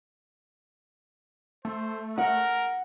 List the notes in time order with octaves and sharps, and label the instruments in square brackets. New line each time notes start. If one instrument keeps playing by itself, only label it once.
[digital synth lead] A3 [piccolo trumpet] C5
[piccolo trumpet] A#4 [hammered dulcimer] F#5